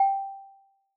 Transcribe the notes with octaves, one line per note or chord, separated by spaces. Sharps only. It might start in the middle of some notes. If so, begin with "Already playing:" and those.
Already playing: G5